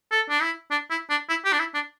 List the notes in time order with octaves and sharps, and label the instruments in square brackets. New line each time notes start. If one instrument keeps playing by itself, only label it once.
[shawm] A4
D4
E4
D4
E4
D4
E4
G4
D4
E4
D4